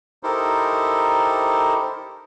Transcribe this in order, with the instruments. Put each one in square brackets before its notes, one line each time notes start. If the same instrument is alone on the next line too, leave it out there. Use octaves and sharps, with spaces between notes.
[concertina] D#4 E4 G4 A4 A#4 C5